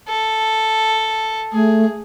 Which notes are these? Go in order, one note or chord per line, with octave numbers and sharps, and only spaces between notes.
A4
A3 G#4